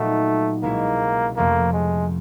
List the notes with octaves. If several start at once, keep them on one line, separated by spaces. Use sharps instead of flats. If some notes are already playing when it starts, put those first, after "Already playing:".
Already playing: A#2 F#3 A3 B3 D#4 F#4
C2 B2 G#3 A#3 C#4 E4
F2 C3 F3 A3 A#3 C#4
G#3